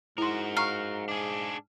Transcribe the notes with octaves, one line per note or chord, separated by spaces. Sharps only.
G#2 E4 F#4 A#4 C6
F5 A#5 C#6
D4 G#4